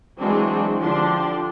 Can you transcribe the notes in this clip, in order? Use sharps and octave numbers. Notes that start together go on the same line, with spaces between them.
E3 F#3 G#3 C4 D4 F#4
D3 F3 D4 G4 C6